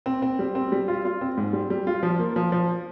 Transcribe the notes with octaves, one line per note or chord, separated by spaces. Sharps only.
C4
C4
G3
C4
G3
F4
F4
C4
G#2
G3
G3
F4
F3
A#3
F3
F3